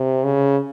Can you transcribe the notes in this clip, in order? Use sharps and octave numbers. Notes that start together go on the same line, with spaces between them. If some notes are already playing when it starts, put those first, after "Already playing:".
Already playing: C3
C#3